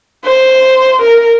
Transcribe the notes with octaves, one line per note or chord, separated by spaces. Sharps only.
C5
A#4